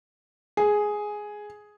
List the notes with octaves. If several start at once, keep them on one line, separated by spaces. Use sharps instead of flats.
G#4